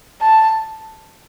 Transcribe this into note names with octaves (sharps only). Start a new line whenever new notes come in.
A5